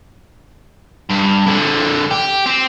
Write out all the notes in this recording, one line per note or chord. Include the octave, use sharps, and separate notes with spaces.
G2
F2 D3
G4
C4